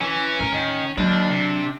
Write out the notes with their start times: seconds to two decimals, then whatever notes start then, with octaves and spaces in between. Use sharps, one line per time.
0.01 E3 C#4
0.40 D#2 A2 A#4
0.53 D#3
0.98 D#2 D3 F#3 D4
1.30 C3